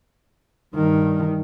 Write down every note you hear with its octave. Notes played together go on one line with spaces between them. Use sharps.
G2 D#3